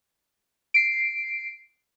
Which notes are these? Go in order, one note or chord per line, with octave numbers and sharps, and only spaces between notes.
C7 D7